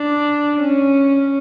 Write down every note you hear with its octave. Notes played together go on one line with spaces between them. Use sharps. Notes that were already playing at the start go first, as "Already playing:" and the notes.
Already playing: D4
C#4